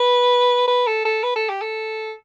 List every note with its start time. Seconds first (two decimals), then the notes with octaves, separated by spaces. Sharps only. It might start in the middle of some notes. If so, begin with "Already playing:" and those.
Already playing: B4
0.68 B4
0.87 A4
1.05 A4
1.23 B4
1.35 A4
1.49 G4
1.62 A4